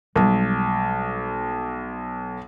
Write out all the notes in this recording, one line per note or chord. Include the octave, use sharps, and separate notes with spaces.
B1 G3 G#3